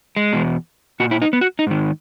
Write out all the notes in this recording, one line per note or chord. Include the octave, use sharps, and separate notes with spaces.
G#3
E2 B2
A#2 F#4
E4
D#4
B3
F#4
D#4
G#2 D#3